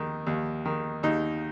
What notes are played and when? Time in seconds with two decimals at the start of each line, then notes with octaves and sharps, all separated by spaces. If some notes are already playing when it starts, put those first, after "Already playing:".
Already playing: D#2 D#3
0.27 D#2
0.65 D#3
1.03 D#2 D#4